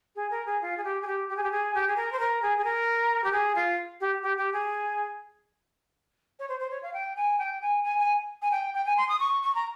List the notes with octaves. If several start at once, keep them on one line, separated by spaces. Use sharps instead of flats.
G#4
A#4
G#4
F4
G#4
G4
G#4
G4
G4
G#4
G4
G#4
G4
G#4
A#4
C5
A#4
G#4
G#4
A#4
G4
G#4
F4
G4
G4
G4
G#4
C#5
C5
C5
C#5
F5
G5
G#5
G5
G#5
G#5
G#5
G#5
G5
G5
G#5
C6
D#6
C#6
C#6
A#5